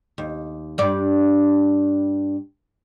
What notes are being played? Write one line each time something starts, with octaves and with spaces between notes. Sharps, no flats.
D#2
G2 D5